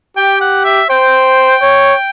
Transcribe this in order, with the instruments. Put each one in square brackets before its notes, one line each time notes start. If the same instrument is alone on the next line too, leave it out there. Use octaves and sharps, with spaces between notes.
[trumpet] G4 [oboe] G5
[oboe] F#5
E5
[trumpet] C5 [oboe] G5
[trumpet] C#5